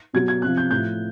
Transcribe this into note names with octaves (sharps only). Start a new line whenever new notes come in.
B2 F#3 G#6
G#6
C3 F3 F#6
G6
A2 F3 G6